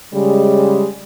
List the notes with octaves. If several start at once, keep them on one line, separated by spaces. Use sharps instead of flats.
C#3 G3 G#3